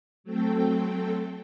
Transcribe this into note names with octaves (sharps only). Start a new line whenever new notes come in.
F#3 A3 C4 A4 G5